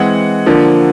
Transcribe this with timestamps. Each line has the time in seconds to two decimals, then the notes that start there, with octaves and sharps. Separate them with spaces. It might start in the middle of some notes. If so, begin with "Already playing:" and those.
Already playing: E3 G#3 C4 F#5
0.46 D3 F3 A#3